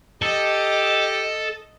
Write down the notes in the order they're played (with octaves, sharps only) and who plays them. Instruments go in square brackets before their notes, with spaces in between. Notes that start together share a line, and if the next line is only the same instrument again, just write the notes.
[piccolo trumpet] G4 [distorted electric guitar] A4 [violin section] D#5